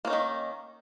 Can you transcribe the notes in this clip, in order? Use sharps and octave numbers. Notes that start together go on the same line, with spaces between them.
D#3 A#3 C#4 D#4